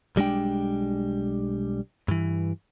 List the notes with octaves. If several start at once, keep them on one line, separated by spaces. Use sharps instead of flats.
B1 G3 G#3 D4 G5
G2 E3